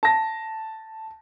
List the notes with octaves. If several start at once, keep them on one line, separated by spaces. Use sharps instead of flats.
A5 A#6